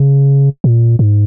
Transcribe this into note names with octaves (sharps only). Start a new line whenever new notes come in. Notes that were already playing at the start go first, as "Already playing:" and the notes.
Already playing: C#3
A#2
G#2